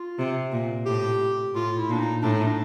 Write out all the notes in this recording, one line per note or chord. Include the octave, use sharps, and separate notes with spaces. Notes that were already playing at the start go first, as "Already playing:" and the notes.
Already playing: F4
C3
A#2
A2 G4
A2 F4
E4
A#2 D4
D#4
A2 D4
D#4
D4